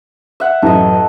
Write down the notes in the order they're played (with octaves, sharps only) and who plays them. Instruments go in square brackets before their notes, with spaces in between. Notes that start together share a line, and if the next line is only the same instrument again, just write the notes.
[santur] E5 F#5
[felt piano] A1 F#2 [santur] A4 D#5